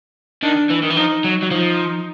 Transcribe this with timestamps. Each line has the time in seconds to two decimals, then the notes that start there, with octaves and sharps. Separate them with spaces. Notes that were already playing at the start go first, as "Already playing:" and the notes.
0.43 D#3 D4
0.70 E3
0.83 D#3
0.90 E3
0.96 F3 D#4
1.24 F#3
1.43 F#3
1.51 F3 D#4